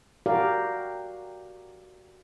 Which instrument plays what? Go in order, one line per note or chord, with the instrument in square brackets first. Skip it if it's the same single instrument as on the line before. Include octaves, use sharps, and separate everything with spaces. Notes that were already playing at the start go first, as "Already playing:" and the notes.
[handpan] F#4 G4 A#4 D5 F5